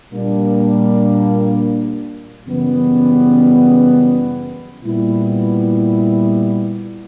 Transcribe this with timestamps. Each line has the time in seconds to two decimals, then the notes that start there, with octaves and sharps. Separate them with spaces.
0.10 A#2 G3 A#3 D4
2.47 F#2 C#3 E3 G3 B3
4.85 A#2 G3 B3 E4